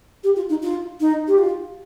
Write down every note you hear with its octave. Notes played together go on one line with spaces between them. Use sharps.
G4
F4
D#4
F4
D#4
G4
F4